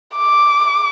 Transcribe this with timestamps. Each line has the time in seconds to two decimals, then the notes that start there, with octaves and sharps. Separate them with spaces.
0.17 D6